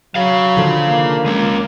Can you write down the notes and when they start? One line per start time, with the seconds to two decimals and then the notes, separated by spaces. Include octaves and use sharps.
0.15 F#3 G#4 F5
0.57 D3 D#3 F3
0.90 A#3
1.26 G#3 C#4